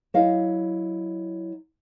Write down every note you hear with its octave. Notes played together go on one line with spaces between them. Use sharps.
F#3 E4 D#5 F5